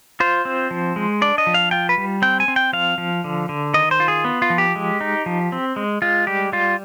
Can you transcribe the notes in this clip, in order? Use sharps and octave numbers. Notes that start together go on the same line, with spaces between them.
F4 C5
C4
F3
G#3
D4 D5
D#5
F3
F5
F4 G5
B4
G3
C4 G5
G#5
C4
G5
F3 F5
F3
D3
D3
D#3 D#5
C5
F4
G#4
B3
F4
F3
G4
G#3
D#4
F3
C4
G#3
G#3 F4
G3 G4
G3 F4